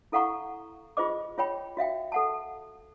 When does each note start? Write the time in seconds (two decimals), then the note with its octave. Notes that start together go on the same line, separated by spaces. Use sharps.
0.12 E4 A4 F5 F#5 A#5 C#6
0.97 F4 G#4 C5 D#5 D6
1.38 F4 C#5 G5 B5
1.77 F#4 E5 F5 G5
2.12 A4 F#5 A5